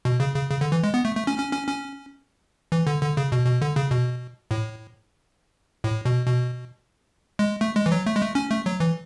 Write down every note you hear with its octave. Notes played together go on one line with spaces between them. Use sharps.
B2
C#3
C#3
C#3
D3
E3
G#3
B3
A3
A3
C#4
C#4
C#4
C#4
E3
D3
D3
C#3
B2
B2
D3
C#3
B2
A2
A2
B2
B2
G#3
A3
G#3
E3
F#3
A3
G#3
A3
C#4
A3
F#3
E3